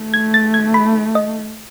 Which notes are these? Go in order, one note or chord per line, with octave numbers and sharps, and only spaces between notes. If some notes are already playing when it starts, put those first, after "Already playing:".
Already playing: A3
G#6
A6
G#6
B5
D#5